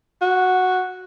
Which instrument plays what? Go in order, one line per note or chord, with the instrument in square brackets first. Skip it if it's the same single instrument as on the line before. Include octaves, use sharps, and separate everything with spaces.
[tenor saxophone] F#4